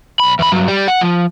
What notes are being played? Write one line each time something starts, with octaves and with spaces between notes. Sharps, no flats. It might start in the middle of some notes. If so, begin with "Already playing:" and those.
B1 B5
E2 B5
G2 F#3
G3
F#5
F3